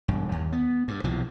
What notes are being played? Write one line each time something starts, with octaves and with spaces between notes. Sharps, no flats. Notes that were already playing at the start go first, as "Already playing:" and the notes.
E1 G2
D#2
B3
G2
B1 C3 E3 F3